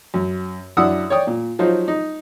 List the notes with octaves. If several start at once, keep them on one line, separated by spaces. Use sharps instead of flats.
F#2
F#2 D4 E4 F#5 D#6 E6
C#5 D5 G5 D#6
A#2
F3 F#3 D#4 F4 C5
D#4